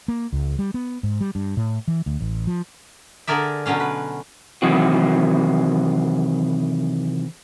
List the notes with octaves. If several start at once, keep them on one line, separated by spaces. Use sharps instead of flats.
A#3
C#2
G3
B3
G#2
G3
G2
A2
E3
D2
A1
F3
D3 G#4 A#4 D5 E5
B2 D3 F#3 C#4 F5
B4
C3 D#3 E3 F#3 C4 F#4